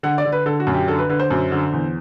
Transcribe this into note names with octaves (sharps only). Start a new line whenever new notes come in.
D3 F#5
D5
D3
B4
D3 A4
F#4
F#2
G4
D3 A4
B4
D3 B4
C5
F#2
D3
E2